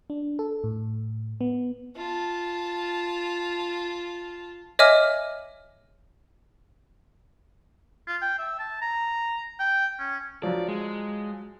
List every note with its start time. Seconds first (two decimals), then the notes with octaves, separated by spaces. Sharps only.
0.10 D4
0.39 A4
0.64 A2
1.41 B3
1.96 F4 A5
4.79 C#5 D#5 E5 G#5 D6 F6
8.07 F4
8.21 G5
8.38 E5
8.59 A5
8.82 A#5
9.59 G5
9.99 C#4
10.43 F3 F#3 D5
10.68 G#3